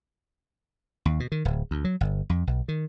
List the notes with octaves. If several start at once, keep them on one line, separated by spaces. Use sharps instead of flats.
D#2
B2
D#3
D1
D2
F#3
G1
F2
B1
D#3